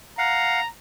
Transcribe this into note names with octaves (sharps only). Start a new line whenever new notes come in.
F5 F#5 A#5